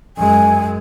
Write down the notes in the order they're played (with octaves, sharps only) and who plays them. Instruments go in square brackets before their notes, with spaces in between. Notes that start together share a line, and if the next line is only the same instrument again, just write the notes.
[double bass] F#2 G#3 [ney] G#5